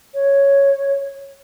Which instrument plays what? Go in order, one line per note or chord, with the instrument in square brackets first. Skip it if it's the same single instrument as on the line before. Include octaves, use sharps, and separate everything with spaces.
[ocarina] C#5